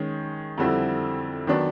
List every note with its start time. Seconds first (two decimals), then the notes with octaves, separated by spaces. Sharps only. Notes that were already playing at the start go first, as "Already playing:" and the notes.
Already playing: D#3 G#3 C#4
0.58 F2 D3 G3 C4 E4
1.47 D#3 F#3 B3 D4